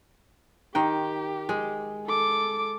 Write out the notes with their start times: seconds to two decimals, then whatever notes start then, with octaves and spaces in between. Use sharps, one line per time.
0.75 D#3 G4 G5
1.49 G#3
2.07 A4 D6